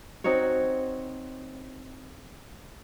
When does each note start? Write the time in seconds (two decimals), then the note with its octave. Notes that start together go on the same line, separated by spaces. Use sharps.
0.24 C4 D#4 F#4 C#5